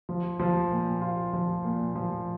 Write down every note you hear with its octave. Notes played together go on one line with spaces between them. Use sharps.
F3
F3
A#2
F4
F3
A#2
F3